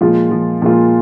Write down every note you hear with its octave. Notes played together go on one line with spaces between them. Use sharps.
A#2 F3 G#3 F4
F3
A#2 F3 G#3 F4